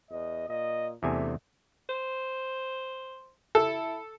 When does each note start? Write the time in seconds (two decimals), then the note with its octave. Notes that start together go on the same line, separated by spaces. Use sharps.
0.11 E2 D#5
0.49 A#2 D#5
1.03 E2 C3 A3 D4 G#5
1.89 C5
3.55 E4 A4